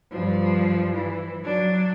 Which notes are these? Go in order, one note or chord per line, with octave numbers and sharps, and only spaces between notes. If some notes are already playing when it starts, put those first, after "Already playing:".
G2 F3
E3
F#3 D4